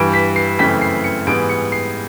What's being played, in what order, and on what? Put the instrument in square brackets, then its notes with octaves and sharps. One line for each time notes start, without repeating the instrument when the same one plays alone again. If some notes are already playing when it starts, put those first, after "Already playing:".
Already playing: [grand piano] G2 E3 G3 D7
B6
C7
F#2 C#3 E3 A3 C4 B6
C7
C#7
G#2 E3 G3 B3 D7
C#7
C7